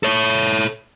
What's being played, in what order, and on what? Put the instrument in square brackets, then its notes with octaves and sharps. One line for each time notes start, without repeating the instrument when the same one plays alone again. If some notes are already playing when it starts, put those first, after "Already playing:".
[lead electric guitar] A4 C#5